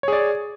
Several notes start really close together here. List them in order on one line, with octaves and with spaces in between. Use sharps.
C#5 G#4 D5